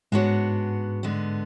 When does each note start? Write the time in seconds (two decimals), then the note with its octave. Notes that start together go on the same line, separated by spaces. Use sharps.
0.12 G#2 G#3 B3 D4 F#4 C#5
1.03 D3 G#3 B3